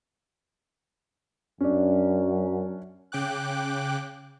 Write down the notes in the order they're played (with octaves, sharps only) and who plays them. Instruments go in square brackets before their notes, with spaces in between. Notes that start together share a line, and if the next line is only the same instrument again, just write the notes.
[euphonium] F#2 [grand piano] C#4 D4
[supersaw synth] C#3 G5 D6 F#6